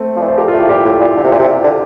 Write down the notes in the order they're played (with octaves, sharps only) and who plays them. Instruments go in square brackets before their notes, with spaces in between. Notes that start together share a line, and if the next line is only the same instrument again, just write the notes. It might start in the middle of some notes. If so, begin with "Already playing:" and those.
Already playing: [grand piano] A3 C4
[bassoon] F3
[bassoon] E3 [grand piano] D5
[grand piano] C5
[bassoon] F3 [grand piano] G4 A#4
[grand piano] F4 A4
[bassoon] A3
[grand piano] E4 G4
[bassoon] A#2 [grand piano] E4 G4
[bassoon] A2
A#2
D3
C3
A#2
C3
D3